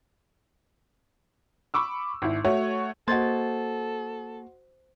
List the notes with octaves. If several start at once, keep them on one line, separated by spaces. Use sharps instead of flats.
B5 C#6 D6 E6
G#1 E4
A3 F#4 C#5
A#3 F#4 A4 C5 D#5 C6 G#6 A6